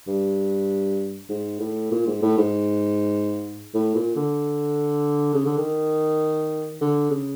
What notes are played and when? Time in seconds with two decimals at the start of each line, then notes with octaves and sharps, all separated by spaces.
0.07 G2
1.29 G#2
1.60 A2
1.92 A#2
2.07 G#2
2.22 A2
2.38 G#2
3.74 A2
3.95 A#2
4.16 D3
5.34 C#3
5.45 D3
5.58 D#3
6.81 D3
7.11 C#3